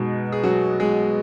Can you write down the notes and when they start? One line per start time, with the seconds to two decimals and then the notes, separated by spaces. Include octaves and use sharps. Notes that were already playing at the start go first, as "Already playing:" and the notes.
Already playing: B2 G#3 D#4 F#4
0.32 G#4
0.43 F#3 F#4
0.80 G#3 G#4